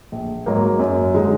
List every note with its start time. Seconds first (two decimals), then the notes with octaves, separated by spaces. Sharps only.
0.12 A#1
0.46 G#2 F#3 A#3
0.79 F#2
1.14 D3 G#3 D#4